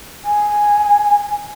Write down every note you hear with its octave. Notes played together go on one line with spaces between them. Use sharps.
G#5